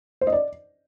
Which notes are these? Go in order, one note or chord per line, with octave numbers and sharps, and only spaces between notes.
C5
D#5
D5